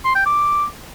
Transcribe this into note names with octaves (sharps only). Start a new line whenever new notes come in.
C6
G5
D6